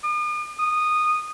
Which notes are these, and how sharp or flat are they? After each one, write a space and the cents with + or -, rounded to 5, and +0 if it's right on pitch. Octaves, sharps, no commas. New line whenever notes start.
D#6 -45
D#6 -15